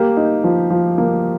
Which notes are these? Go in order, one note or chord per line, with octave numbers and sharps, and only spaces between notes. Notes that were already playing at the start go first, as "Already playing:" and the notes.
Already playing: A#3 G4
D#4
F3
F3
A#3